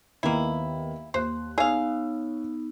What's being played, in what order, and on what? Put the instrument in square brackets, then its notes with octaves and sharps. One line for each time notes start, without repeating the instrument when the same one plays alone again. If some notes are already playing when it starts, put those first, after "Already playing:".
[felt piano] D#2 D#3 B3 [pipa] A#3 E4
[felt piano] D#2 F#6 [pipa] C5
[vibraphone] B3 D#4 [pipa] G#4 F5 [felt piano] C#5 E6